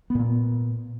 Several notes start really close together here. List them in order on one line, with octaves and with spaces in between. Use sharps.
B3 A#2 A#3